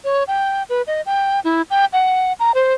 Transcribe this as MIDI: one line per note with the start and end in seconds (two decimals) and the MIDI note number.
0.05 0.24 73
0.28 0.63 79
0.69 0.82 71
0.87 1.01 75
1.06 1.40 79
1.44 1.62 64
1.70 1.85 79
1.93 2.33 78
2.40 2.52 82
2.55 2.74 72